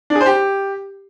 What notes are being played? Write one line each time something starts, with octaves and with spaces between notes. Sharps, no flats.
D4
G#4
C5
G4